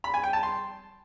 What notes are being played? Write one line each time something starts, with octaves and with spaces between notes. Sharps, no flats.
B5
G#5
G5
A5
C6